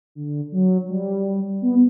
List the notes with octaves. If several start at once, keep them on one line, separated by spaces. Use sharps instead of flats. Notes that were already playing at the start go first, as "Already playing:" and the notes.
D3
F#3
G3
B3